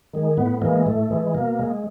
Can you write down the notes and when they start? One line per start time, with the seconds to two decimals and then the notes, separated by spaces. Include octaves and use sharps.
0.14 D#3 G#3
0.37 A2 B3
0.62 E3 G#3 A#3
0.86 A2 A3
1.11 E3 G#3
1.35 B2 A#3
1.59 G#3